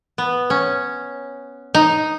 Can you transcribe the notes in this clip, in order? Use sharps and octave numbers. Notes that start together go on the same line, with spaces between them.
B3
C#4
D#4